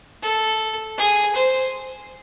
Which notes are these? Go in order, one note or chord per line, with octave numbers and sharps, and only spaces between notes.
A4
G#4
C5